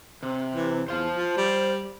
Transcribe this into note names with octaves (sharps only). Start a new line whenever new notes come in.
C3
E3
E2 C5 F5
F3
G3